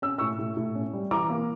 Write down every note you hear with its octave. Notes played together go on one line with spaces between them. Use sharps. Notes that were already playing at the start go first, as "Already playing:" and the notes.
C#4 E6
A2 C#6 E6
A2
A2
C#4
G3
E3 A#5 D6
A#3